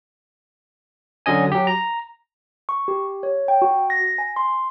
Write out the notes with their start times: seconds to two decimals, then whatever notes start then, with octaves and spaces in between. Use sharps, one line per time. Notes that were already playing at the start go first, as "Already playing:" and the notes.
1.26 D3 F#3 C#4 D#5 G#5
1.52 F#3 G4
1.67 A#5
2.69 C#6
2.88 G4
3.23 C#5
3.48 G5
3.62 F#4
3.90 A#6
4.18 G#5
4.36 C6